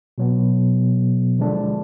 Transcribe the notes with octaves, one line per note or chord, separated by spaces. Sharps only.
B2 F#3 B3
D3 F3 G#3 D4